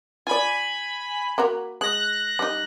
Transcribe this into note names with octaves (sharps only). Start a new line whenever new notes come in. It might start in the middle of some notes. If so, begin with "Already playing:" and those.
F4 D5 G#5 B5
A#3 F#4 A#4
G#3 F#6 A#6
G3 D#4